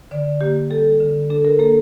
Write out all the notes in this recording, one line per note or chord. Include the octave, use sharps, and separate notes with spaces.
D3 D5
A#3 G4
G3 A4
D3
D4 A4
A#4
A#3 A4